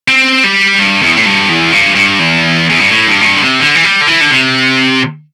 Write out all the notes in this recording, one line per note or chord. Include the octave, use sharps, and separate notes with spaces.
C4
G3
G2
E2
A2
G2
E2
G2
G2
E2
E2
G2
A2
G2
A2
G2
D3
C3
D3
E3
G3
D3
E3
D3
C3